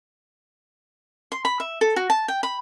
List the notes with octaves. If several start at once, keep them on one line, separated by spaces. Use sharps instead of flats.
C6
B5
E5
A4
F#4
A5
G5
B5